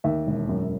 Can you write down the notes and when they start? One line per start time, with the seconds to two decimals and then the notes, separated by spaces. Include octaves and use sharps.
0.04 D#2 E5
0.27 E1
0.49 F#2